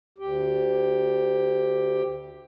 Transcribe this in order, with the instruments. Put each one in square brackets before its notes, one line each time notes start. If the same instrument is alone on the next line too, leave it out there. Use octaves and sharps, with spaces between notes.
[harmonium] D2 G4